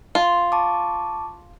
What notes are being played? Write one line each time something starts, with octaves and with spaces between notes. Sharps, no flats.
F4
A5 C#6 D6